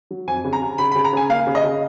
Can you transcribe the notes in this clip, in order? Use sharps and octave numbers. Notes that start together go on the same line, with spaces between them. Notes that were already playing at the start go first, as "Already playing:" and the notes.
F#3
F2 G#5
C#3
A#5
C#3
C#3 B5
B5
C#3
A#5
C#3 G#5
A#3 F5
C#3
D#5
C#3